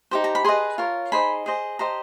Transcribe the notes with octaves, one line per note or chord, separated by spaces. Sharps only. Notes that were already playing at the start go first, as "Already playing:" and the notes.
D#4 G4 C5
A#5
B5
G#4 B4 D#5 C6
F4 A#4 C#5
D#4 G#4 C5 D#5 B5
G#4 C5 D#5
G4 C5 D#5 A#5